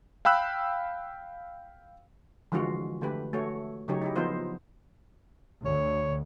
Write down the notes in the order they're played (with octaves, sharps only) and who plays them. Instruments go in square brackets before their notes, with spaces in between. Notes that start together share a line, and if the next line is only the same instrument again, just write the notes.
[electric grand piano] F5 G5 B5 E6 F#6
[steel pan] D3 E3 F3 G#3 F4 F#4
D3 A3 G4 B4
A3 F#4 C#5
C#3 F#3 D#4 G4 C#5
D#4 E4 G4
F3 B3 D#4 F4 C5
[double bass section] D2 [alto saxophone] C#5